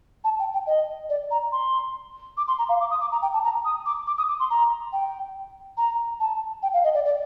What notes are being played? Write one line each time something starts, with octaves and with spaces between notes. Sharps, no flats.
A5
G5
G5
D#5
D5
A#5
C6
D6
C6
A#5
F5
D6
D#6
D6
A#5
G5
A5
A#5
D#6
D6
D6
D#6
D6
C6
A#5
G5
A#5
A5
G5
F5
D#5
D5
D5